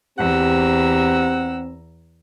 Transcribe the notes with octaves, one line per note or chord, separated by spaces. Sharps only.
E2 C4 G4 F#5 A#5 E6